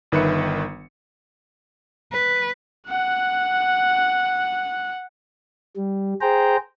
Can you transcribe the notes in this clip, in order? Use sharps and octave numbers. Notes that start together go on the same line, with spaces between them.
G1 D#3 B4 E5 C#7
B4
F#5 F#6
G3
G#4 C5 G5 A#5